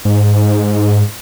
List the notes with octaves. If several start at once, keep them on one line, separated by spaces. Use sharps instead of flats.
G#2